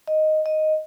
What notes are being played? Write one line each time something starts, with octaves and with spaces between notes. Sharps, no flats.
D#5
D#5